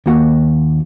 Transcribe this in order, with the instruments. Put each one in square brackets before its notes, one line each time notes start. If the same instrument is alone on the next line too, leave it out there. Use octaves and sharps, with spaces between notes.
[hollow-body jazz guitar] D#2 A#3 F#4 F#5